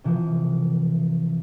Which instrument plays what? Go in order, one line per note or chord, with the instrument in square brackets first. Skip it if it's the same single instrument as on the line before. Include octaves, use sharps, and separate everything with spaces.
[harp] C3 E3 F3